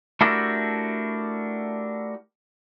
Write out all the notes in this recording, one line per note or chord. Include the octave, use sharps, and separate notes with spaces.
A3 D4 E4 F#4 G4 A#4